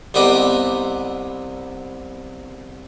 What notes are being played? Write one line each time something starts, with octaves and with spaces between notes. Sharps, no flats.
C2 C3 B3 G4 D5 D#5